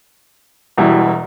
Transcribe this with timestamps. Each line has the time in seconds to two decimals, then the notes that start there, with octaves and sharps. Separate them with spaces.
0.77 E1 E2 B2 G3 E4